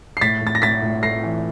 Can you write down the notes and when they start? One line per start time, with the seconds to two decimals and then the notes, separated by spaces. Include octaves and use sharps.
0.17 C7
0.21 A2 A6 B6
0.41 A2
0.47 A6
0.55 A#6
0.62 A2 A6 B6
0.82 A2
1.03 A3 A#6 C7
1.23 E3